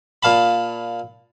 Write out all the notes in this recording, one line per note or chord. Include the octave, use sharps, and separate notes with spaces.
A#2 F5 A5 B5